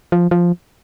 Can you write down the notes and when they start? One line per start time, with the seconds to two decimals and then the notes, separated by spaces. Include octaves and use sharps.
0.12 F3
0.31 F3